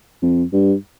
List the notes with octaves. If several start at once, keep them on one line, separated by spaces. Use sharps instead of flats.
F2
G2